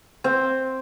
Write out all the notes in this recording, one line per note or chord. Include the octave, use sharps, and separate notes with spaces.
C4